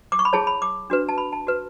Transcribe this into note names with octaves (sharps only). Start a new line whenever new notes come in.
D6
C#6
B5
E4 G#4 C#5 A5
B5
D6
D4 F#4 B4
A5
B5
A5
F#4 B4